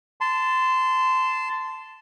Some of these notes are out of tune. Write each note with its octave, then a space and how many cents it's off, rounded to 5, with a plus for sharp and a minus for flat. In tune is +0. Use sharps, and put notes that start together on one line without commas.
A5 +0 C6 -20